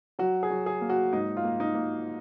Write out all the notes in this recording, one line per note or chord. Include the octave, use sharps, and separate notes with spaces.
F#3 F#4
G#4
F#3
G#4
A#3
F#4
G#2 D#4
F4
A#3
D#4
A#3